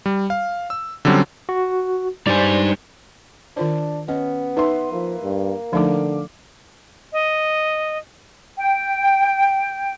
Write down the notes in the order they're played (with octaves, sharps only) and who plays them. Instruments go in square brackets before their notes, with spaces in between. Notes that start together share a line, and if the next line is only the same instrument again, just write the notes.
[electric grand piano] G3
F5
E6
D3 F#3 G3 C4 C#4
[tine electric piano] F#4
[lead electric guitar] G2 G3 [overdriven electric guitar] D#4 G#5 [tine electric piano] C5 D5
[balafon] D#3 F4 C5 [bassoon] D4
[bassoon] B3 [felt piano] C#4 [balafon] D#5
[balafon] D#4 [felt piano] B4 E5 C6
[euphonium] F3 [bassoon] A#3
[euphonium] G2
[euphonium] D3 [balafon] F3 A3 D#4 [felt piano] F5 D6
[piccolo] D#5
[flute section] G5